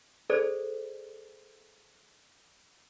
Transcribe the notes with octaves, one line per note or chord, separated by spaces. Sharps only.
G#4 A4 C5 D5